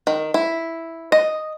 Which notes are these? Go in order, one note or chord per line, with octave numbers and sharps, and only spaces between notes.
D#3
E4
D#5